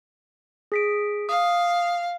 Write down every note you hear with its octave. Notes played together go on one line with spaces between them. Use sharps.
G#4 B6 D7
F5 D#6